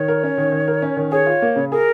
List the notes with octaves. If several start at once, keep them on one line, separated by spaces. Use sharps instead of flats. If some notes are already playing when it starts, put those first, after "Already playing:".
Already playing: D#3 C#5
A#4
C#4
D#3
D#3
A#4
C#4
D#3
G#4 C#5
F4
A#3
C#3
G#4 A#4